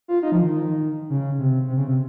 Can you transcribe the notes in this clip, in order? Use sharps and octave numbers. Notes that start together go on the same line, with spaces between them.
F4
D#4
F3
D#3
C#3
C3
C3
C#3
C3